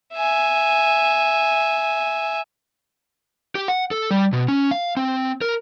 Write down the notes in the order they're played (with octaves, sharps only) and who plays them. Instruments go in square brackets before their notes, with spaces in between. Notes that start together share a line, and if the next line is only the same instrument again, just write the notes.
[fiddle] E5 G#5
[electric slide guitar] G4
F#5
A4
G3
B2
C#4
F5
C4
A#4